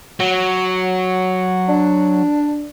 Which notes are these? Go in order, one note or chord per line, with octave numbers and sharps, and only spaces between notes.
F#3
D4